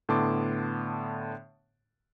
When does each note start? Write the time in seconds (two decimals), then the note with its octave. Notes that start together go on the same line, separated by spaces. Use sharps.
0.09 A2 D3 B3 A5 C6 D6